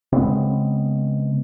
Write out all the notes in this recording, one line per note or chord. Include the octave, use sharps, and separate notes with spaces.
C#3 G#3 B3 C4